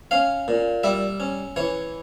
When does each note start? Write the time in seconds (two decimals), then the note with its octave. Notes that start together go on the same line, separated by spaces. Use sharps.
0.11 C#4 F5
0.48 A#2
0.83 G3 E5
1.20 C#4
1.56 E3 C#5